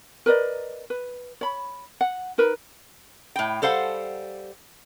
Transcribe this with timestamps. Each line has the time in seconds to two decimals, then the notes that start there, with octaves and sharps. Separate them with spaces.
0.26 A#4 B4 D5 D#5
0.90 B4
1.41 C#5 B5
2.01 F#5
2.38 D#4 A#4 B4
3.36 A2 G5
3.62 G3 A4 C5 F5 F#5